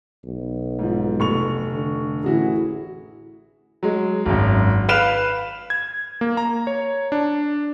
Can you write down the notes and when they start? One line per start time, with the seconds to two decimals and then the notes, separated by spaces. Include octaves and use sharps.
0.25 B1
0.79 G#2 F3
1.20 F1 C#6 F7
1.73 D3
2.24 A1 E4 F#4 G#4
3.83 F#3 G#3
4.26 G#1 F#2
4.89 B4 F5 F6 E7 F7
5.70 G#6
6.21 A#3
6.37 A#5
6.67 C#5
7.12 D4